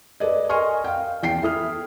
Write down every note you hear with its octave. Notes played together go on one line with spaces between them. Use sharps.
A4 B4 D5 D#5
A#4 D#5 G#5 C6 C#6 F6
F5 G5
E2 G5 C7
E4 A4 D#6 F6